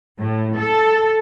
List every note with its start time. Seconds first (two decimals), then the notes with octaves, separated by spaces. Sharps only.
0.19 A2
0.57 A4